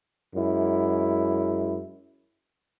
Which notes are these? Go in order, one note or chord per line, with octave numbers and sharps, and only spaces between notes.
F#2 G#3 E4